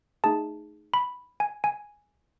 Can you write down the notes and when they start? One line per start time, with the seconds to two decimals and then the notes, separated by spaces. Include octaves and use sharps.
0.24 A3 D#4 G#4 A5
0.94 B5
1.40 G#5
1.64 G#5